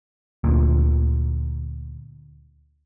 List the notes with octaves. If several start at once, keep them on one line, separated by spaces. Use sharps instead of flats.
D2 A#2